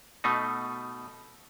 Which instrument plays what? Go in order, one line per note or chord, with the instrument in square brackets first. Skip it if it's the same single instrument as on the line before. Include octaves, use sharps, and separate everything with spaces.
[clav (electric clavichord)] B2 A3 D#4